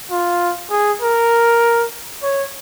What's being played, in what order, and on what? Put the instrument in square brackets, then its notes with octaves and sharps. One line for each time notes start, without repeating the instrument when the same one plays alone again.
[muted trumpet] F4
G#4
A#4
C#5